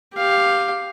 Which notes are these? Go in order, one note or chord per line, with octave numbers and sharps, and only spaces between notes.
G4 F5